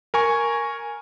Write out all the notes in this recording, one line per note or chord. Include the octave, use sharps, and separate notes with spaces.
A#4 G#5 C#6